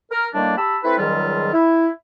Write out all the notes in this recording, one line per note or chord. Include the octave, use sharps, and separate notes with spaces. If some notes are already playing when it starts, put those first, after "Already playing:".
A#4
A2 D#3 G3 A#3 D4
G4 A5 B5 E6
A3 C4 E4 A4 B4
C#2 G#2 D#3 F#3 G3 F4
E4